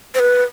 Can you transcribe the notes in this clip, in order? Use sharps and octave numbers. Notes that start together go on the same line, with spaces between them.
C5
B4